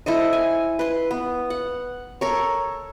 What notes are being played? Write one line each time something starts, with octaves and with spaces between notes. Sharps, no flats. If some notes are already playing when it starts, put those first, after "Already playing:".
E4 A4 C5 D#5
G#5
B4 C6
B3
F#5
A4 A#4 C#5